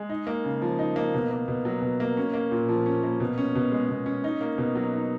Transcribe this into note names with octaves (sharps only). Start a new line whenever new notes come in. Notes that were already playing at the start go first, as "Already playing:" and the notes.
Already playing: G#3
D#4
A#3
C#3
F3
D#4
A#3
B2
A#3
B2
F#3
B2
A#3
C#4
A#3
A#2
F3
C#4
A#3
B2
C#4
B2
G#3
B2
C#4
D#4
A#3
B2
F#3
D#4